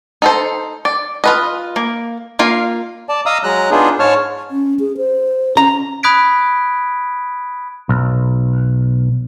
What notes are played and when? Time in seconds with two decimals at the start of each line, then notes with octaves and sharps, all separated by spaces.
0.22 D#4 A4 C5
0.85 D5
1.24 F4 B4 D#5
1.76 A#3
2.39 A#3 F4 F5
3.09 D5 A5
3.26 D#5 F5 A#5 D#6 E6
3.44 F#3 G#3 A#5 F#6
3.71 B3 D4 D#4 F4 G#4
3.99 G#2 G#3 C#5 A5 F6
4.51 C#4
4.80 G#4
4.97 C5
5.57 C#4 A#5
6.03 B5 D#6 F#6 G#6 B6 D7
7.89 B1